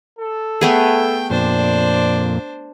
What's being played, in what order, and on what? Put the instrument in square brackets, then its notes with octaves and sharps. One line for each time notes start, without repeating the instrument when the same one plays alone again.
[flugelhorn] A4
[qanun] A3 B3 G#4 [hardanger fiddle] G5
[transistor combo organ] F2 A#2 [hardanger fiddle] D4 C5 [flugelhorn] D5